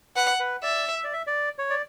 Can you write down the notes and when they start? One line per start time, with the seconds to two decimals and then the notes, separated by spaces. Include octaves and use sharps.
0.16 B4 F#5
0.40 B4
0.63 D5 E5
0.95 E5
1.04 D5
1.13 E5
1.27 D5
1.58 C#5
1.70 D5